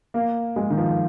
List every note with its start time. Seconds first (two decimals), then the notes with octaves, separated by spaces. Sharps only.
0.14 A#3
0.56 G#3
0.70 D#3
0.77 F3